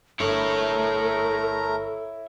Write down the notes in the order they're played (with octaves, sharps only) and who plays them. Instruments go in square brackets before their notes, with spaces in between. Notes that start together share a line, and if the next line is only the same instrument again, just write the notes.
[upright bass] G1 [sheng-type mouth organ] A3 A#4 A#5 [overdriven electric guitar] E4 C#5 [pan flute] A4